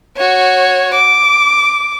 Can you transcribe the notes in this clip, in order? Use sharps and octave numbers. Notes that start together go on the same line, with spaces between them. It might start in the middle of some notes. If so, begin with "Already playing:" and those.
F#4 C#5
D6